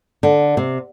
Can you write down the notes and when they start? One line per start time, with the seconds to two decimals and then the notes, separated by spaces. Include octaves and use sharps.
0.23 D3
0.57 C3